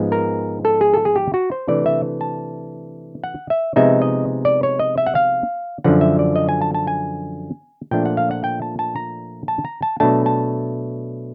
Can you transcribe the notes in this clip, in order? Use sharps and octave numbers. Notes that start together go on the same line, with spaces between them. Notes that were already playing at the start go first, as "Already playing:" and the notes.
Already playing: G#2 F3 G#3 B3
A#4
A4
G#4
A4
G#4
G4
F#4
C5
C3 E3 A3 D4 D5
E5
A5
F#5
E5
C3 F3 G#3 B3 D#4 E5
D#5
D5
C#5
D#5
E5
F#5
F5
F#2 D3 F3 F#5
E5
D5
D#5
G#5
A5
A5
G#5
A#2 F3 A3 D4 G5
F#5
F5
F#5
G5
A5
A5
A#5
A5
A#5
A5
B2 F#3 A3 D4 A5
A5